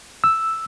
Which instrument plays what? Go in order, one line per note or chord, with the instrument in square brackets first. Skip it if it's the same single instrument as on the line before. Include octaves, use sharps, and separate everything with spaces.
[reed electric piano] E6